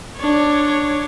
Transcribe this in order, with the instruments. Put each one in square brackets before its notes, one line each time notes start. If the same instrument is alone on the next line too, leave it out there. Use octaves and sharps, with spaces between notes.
[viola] D4 C#5